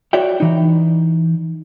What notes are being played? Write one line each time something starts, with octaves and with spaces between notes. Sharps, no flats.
F#4 C#5 D5 E5 G5
E3 D#4